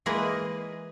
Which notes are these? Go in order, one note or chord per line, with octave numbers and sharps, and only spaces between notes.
E3 G#3 A#3 G#4 B4 D#5